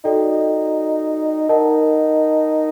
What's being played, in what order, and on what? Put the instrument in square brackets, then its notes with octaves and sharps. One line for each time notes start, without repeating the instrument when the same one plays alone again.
[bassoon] D#4 [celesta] F#4 A4 D5 G5
[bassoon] D#4 [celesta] A#4 D#5 F#5 A5